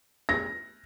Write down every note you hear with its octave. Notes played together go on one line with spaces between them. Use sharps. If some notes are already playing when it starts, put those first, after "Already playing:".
A#6